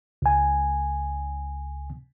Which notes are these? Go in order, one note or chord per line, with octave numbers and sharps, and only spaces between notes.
C#2 G#5